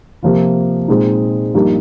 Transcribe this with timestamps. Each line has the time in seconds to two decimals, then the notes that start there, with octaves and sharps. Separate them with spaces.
0.23 C3 F3 A#3 F4
0.88 A#2 G#3 C4 D#4
1.54 G2 F3 A#3 D#4 G4